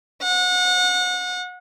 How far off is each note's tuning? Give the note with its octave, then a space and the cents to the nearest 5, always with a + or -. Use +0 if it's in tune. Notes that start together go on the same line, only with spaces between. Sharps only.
F#5 -30